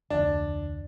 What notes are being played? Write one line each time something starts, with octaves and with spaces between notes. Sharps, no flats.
F1 D2 D4